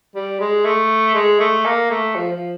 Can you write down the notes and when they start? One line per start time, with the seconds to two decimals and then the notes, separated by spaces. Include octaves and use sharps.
0.15 G3
0.40 G#3
0.65 A3
1.15 G#3
1.40 A3
1.65 A#3
1.90 A3
2.16 F3
2.32 F3